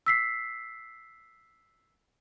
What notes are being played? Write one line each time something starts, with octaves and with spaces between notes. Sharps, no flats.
E6 B6 C7